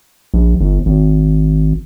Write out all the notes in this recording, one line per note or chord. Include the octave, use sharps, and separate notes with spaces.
A#1
G1
G#1